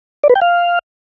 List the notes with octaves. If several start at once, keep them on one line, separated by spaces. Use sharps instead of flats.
D5
B4
G5
F5